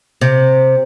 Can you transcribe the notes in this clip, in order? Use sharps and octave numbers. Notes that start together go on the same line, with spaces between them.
C3